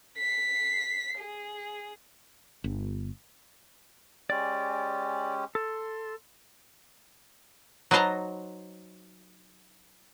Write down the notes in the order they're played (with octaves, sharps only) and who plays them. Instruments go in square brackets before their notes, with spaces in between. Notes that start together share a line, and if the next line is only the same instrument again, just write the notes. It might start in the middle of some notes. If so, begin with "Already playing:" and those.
[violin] B6 C7
G#4
[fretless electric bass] G1
[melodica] G#3 C#4 G4 [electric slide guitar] D5
[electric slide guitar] A4 [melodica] C6
[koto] F#3 D#4 B4 C5 A5 A#5